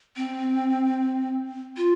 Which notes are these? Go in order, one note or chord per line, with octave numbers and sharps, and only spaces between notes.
C4
F4